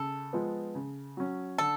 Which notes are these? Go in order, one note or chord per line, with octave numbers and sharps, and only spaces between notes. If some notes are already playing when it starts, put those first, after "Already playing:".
Already playing: C#3 A4
F3 G#3 B3
C#3
F#3 C#4
D3 A4